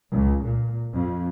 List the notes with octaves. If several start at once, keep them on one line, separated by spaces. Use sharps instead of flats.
C#2
A#2
F2